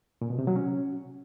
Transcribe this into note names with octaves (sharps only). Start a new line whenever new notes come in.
A#2
B2
C3
F#3
C#4